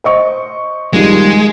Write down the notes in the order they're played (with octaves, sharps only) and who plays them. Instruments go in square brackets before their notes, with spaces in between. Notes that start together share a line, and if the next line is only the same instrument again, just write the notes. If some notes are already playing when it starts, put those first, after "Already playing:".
[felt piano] C5 D#5 C#6
[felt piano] D#2 F3 G3 [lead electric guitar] G#3